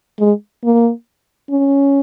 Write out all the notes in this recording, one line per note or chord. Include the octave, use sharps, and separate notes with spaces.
G#3
A#3
C#4